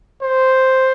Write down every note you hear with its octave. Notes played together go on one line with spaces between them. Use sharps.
C5